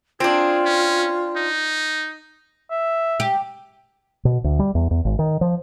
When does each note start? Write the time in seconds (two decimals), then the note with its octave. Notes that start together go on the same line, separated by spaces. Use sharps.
0.20 C4 D4 F4 G#4
0.65 C#4
1.36 D#4
2.71 E5
3.20 G4
4.25 B2
4.44 D2
4.59 G3
4.75 E2
4.91 E2
5.05 G#1
5.19 D#3
5.41 F3